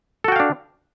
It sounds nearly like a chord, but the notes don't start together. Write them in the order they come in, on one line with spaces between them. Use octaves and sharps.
A4 F#4 G5 F5 D4